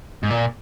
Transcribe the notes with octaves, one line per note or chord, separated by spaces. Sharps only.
G#2
A#2